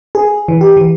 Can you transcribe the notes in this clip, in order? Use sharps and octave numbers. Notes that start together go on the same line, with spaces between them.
G#4
E3
G4
E3